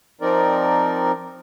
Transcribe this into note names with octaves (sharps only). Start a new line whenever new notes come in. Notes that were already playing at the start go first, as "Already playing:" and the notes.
F3 C4 D#4 A#4 D5